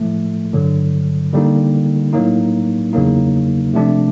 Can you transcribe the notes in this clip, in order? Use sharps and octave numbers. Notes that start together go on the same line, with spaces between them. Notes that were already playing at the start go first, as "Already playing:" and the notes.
Already playing: A2 F3 A3
G2 D3 F#3
D3 G3 A#3 D#4
A2 F#3 A#3 D#4
E2 C#3 F#3 A#3 D#4
C3 F3 A3 D4